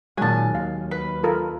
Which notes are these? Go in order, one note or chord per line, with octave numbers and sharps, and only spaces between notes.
A#2 D#3 F#3 G#3 G#5 A5
D#2 F5
B4
F4 A4 A#4